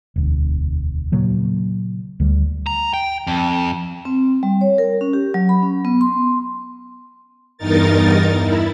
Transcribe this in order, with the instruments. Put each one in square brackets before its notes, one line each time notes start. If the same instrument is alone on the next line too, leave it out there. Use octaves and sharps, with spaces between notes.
[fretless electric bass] E1 D2
A#2 C#3 F#3 A#3
D2 D3 G3
[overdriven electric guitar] A#5
G5
F2
[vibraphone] C4
G3
C#5
A#4
C#4
G4
F#3
B5
C#4
B3
C6
[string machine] E2 G2 D#4 A#4 A6
E4